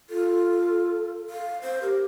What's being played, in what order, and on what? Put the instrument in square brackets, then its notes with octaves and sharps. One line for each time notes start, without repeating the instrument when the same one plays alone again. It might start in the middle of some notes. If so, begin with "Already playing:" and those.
[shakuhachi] F4 [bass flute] A4
[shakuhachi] F5
C5
[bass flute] G4 [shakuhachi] A#4